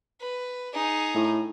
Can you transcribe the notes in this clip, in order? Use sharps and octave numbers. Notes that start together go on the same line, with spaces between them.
B4
D#4 G#4
A2